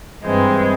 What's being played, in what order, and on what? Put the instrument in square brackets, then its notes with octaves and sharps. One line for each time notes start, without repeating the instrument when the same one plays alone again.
[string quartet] G2 E3 G#3 C4